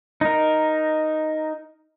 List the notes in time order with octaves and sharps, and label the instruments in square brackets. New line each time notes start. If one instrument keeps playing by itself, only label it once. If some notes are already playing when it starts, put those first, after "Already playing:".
[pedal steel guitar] D#4 A#4